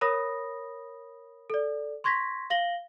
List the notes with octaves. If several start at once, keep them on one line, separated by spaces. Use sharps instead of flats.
A#4 C#5 B5 D#6 A#6
A4 D5
C6 C#6 G#6 A#6 B6
F5 A#6 F#7 G7